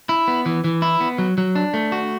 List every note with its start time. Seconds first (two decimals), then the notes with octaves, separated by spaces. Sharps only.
0.09 E4
0.28 B3
0.46 E3
0.64 E3
0.82 E4
1.01 B3
1.18 F#3
1.38 F#3
1.55 D4
1.74 A3
1.92 F#4